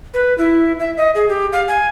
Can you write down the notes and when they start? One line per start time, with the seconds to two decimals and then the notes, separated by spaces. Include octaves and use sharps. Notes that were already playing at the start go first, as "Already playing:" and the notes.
0.14 B4
0.38 E4
0.79 E5
0.97 D#5
1.15 G#4
1.29 G4
1.52 F5
1.68 G#5